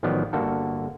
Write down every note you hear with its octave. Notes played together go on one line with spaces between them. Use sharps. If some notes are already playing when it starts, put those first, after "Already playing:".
A1 D#3 F3 F#3 B3 D5
G1 D3 A#3 F#4 A4